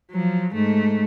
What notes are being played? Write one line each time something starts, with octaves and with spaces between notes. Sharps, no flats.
F3 F#3
G#2 A3